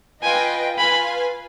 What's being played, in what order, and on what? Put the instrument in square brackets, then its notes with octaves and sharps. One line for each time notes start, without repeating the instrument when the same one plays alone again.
[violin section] F4 B4 D#5 G5 [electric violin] G#5
[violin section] F4 B4 F5 G#5 [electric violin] B5